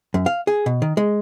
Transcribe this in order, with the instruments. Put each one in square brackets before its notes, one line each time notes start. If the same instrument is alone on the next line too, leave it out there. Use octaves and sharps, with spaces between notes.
[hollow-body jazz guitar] F#2
F5
G#4
B2
D#3
G#3